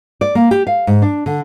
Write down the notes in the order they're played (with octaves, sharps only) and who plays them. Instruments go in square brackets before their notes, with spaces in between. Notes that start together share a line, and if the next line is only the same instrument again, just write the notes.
[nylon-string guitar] D5
A#3
G4
F5
G#2
D4
D3